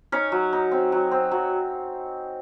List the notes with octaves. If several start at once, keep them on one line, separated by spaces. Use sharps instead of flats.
C#4 D#4 C#5
F#3
D#4
C4
F#3
C4
F#3